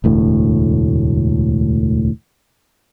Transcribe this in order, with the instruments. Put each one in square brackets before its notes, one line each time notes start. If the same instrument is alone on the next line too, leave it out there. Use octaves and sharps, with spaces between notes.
[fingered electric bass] E1 D2 A2